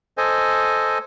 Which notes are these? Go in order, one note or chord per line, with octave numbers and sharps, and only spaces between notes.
A4 C5 D#5 G#5